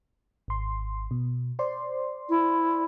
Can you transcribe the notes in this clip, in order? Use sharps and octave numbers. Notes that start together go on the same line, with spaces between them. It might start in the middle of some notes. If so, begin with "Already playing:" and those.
G#1 C6
B2
C5 D5 C6
E4